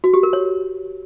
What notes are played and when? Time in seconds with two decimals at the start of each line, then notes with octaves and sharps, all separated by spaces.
0.04 F#4
0.14 G4
0.23 A#4
0.33 C#5